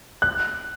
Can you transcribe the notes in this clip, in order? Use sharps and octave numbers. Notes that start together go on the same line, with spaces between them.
F#6